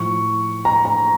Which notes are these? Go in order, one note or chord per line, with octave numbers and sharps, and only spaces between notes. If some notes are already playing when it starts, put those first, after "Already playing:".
Already playing: A2 F3 C#6
A#5
A#5